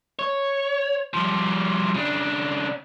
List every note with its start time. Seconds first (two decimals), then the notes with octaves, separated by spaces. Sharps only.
0.19 C#5
1.13 F3 G3
1.95 C#3 D4